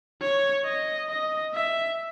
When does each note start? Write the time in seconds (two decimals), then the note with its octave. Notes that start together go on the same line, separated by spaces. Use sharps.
0.21 C#5
0.65 D#5
1.10 D#5
1.54 E5